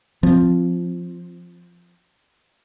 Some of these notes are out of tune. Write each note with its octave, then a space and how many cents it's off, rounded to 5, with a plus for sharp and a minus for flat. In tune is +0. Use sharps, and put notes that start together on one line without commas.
F3 +0 C4 +0